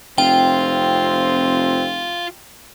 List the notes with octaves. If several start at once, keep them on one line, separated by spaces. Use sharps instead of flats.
F1 C4 F4 G5